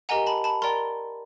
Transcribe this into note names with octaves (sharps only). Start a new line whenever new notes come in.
G4 A#4 D#5 F#5 G#5 A#5
A5 B5
A5 B5
A#4 D5 G5 A#5 C6